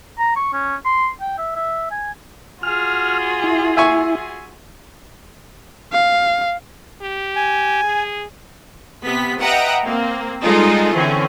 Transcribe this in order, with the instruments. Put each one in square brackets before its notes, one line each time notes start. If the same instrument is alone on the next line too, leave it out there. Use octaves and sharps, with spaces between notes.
[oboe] A#5
C#6
C#4
C6
G5
E5
E5
G#5
[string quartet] F4 F#4 G#4 [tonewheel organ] F6
[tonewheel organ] E4
[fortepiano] E5 G#5 C#6
[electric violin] F5
[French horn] G4
[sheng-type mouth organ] G#5
[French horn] G#4
[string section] C3 B3 B6
B4 D#5 E5 F#5 G5 A#5
A#3 C4
G3 G#3 D#4 F4 G#4 A4
D3 E3 C4 C#4